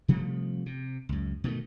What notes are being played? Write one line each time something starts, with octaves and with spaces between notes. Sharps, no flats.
C3 F3 G3 A3
C3
C#2 F#2
B2 D#3 A3